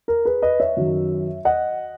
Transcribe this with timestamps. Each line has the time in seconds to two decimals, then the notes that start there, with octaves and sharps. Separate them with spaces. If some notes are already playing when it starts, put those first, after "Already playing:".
0.08 A#4
0.25 G#4 B4
0.42 B4 D#5
0.60 C#5 E5
0.77 F#2 D#3 F#3
1.45 D#5 F#5